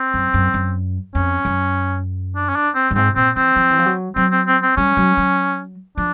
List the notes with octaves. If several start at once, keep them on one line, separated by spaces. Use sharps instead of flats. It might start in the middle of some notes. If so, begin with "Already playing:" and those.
Already playing: C4
F#2
F#2
F#2
F2 C#4
F#2
D4
C#4
D4
C4
G2
G#2 C4
A#2 C4
E3 C4
F3
E3
F3
F#3
F#3 C4
C4
C4
C4
G3 C#4
F#3
F#3
F3 D4